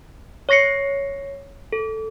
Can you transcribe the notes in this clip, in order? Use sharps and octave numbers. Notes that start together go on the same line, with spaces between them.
C#5 C#6 A#6 C7 C#7
A4